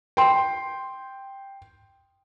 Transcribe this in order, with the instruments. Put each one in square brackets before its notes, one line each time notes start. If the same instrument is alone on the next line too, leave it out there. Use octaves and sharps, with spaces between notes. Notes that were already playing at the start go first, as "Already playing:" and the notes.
[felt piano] G5 C6